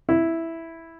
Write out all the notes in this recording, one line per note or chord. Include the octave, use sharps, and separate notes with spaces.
E4